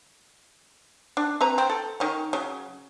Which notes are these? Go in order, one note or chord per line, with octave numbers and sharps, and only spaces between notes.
D4
C4 B4 A#5
C4
A4
D#3 C#4
C#3 F#3